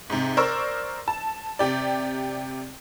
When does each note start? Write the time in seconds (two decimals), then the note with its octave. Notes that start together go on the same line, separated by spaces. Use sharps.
0.10 G#2 C3
0.37 A#4 C5 D5 C#6 E6
1.08 A5
1.59 C3 G4 D5